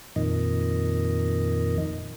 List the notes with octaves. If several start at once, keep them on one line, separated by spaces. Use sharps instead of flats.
F2 A#2 D#3 D#5